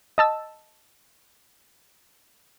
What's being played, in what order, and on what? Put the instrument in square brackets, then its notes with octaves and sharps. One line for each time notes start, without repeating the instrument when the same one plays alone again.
[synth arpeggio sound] D#5 A5 E6